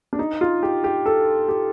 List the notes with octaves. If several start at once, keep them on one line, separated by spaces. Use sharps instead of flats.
D4
D#4
F4
G4
G4
A4
G4